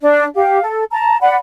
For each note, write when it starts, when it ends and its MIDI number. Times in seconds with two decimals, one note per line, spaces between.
0.01 0.24 62
0.35 0.61 67
0.35 0.61 77
0.63 0.84 69
0.91 1.17 81
0.91 1.17 82
1.21 1.36 74
1.21 1.36 78
1.21 1.36 83